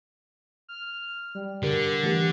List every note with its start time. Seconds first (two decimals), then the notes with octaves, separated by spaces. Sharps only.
0.69 F6
1.35 G3
1.63 D3 G4 A#4
2.04 E3 A3 G4